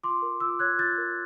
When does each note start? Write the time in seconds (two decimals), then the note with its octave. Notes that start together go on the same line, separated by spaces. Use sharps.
0.03 F4 C6 D6
0.22 A#4
0.40 F4 D6 E6
0.59 C#5 F#6 G#6
0.78 F4 G6 A6
0.98 A#4